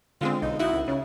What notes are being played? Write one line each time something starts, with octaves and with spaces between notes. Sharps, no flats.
D3 G#3 C4 F4
B1 D#4
D#4 E4 F#4
C#2
C#3 C#4